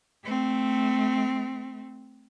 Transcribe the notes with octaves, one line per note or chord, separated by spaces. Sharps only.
A3 C4